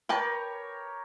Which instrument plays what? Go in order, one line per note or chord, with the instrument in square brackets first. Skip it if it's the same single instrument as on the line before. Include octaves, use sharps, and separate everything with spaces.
[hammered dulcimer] G4 A#4 C#5 [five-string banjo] B4 G5 A5